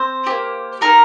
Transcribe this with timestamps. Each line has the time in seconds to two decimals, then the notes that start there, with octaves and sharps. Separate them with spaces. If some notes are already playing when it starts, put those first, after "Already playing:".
Already playing: C4 C5
0.27 A#3 G4
0.81 A#3 D#4 G4 A#4